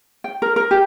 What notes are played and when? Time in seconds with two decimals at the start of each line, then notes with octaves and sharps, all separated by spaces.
0.24 G5
0.42 A#4
0.56 A#4
0.71 G4